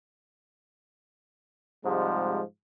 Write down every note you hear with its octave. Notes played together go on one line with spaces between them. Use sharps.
G#2 C3 F3 G3 G#3